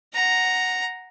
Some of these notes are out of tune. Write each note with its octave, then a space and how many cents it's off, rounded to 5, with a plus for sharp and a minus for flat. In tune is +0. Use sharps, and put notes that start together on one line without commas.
F#5 +0 A#5 +0